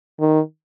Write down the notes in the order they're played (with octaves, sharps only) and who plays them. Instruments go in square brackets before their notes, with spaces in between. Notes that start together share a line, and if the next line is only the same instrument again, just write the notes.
[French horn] D#3